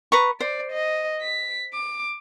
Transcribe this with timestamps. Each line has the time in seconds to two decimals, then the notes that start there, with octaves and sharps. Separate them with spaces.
0.12 B4 A#5 C#6
0.40 C5 D5
0.72 D#5
1.22 B6
1.74 D6